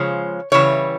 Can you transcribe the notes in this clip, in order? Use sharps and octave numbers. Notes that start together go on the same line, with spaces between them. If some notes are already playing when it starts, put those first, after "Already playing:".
Already playing: C#3 F3 G#3 C#5
C#3 E3 G3 C#5